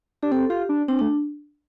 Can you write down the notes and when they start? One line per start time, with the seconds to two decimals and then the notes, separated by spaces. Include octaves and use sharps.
0.23 D4 G4
0.32 C4 A4
0.50 F4 G4
0.69 D4
0.88 C4 D4
0.99 A3 D4